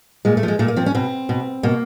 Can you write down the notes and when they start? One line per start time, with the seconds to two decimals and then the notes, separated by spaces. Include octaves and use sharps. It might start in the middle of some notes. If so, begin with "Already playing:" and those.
0.25 A#2 G#3
0.37 A3
0.43 F3
0.48 G#3
0.59 A#2 A3
0.68 A#3
0.76 F3 C4
0.86 C#4
0.95 B2 C4
1.29 B2
1.63 B2 A#3